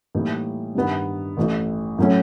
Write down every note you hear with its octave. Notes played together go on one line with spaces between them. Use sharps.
A2 E3 G3 A#3 D#4
G2 D#3 G3 B3
A1 A2 E3 A3
A2 F#3 A3 C#4